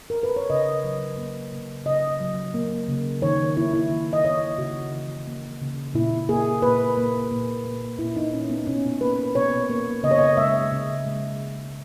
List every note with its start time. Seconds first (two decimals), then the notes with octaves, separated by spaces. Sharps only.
0.10 A#4
0.23 B4
0.36 C#5
0.50 C#3 D#5
0.84 F#3
1.18 A#3
1.53 C#3
1.86 C#3 D#5
2.20 F#3
2.54 A#3
2.88 C#3
3.22 D#3 C#5
3.57 A#3 E4
3.74 E4
3.90 D#3
4.13 D#5
4.25 A#3 C#5
4.58 C#3 F#4
4.92 E3
5.27 A#3
5.61 C#3
5.94 A#2 E4
6.29 A#3 G#4
6.62 A#2 B4
6.97 A#3
7.31 A#2
7.65 A#3
7.99 A#2 E4
8.16 D#4
8.33 A#3 C#4
8.50 B3
8.67 B2 C#4
9.01 A#3 B4
9.35 B2 C#5
9.70 A#3
10.03 C#3 D#5
10.11 C#5
10.19 D#5
10.37 G#3 E5
10.72 C#3
11.05 G#3
11.40 C#3